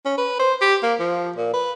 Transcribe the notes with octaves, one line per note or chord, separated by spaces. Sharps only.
C#4
B4
C5
G4
A#3
F3
A#2
B4